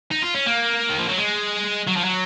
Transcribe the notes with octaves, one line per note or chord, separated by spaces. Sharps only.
D#4
F4
C#4
A#3
D#3
F3
F#3
G#3
F#3
F3
F#3